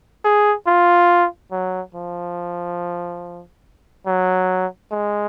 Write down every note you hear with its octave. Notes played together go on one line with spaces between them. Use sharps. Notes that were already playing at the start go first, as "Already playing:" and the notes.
G#4
F4
F#3
F3
F#3
G#3